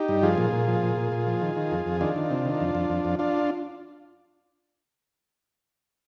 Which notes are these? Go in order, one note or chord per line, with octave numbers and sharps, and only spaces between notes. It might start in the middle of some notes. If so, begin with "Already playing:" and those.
Already playing: D#4 G4
G2
F3 F4 G#4
A#2
A#2
F3
A#2
A#2
A#2
F3
D#3
D#3
F2
F2
D#3 D4 F4
D#3
C3
D#3
F2
F2
F2
F2
D4 F4